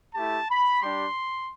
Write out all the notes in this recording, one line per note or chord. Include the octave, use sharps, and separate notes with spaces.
A3 E4 G4 A5
B5
G3 D4 G4 C6